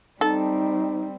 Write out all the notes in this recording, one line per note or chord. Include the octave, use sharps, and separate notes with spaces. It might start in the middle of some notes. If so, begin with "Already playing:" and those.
G3 C4 D#4 A4